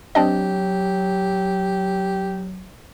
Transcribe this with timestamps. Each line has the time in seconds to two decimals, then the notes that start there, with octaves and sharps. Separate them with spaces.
0.15 F#3 C4 D4 G4 D#5